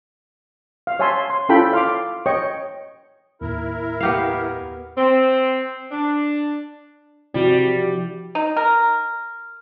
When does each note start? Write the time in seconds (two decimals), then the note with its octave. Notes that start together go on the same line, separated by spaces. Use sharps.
0.87 F5
0.99 C#5 E5 G#5 A5 C6
1.30 C6
1.49 C#4 E4 F4 A4 G5 B5
1.73 F5 C6 D6
2.26 C#5 D#5 G5 C#6
3.41 D#2 A2 E4 A#4
4.01 B3 G4 F5
4.98 C4
5.92 D4
7.34 C3 F3 G3 E4 F#4
8.35 D#4
8.57 A#4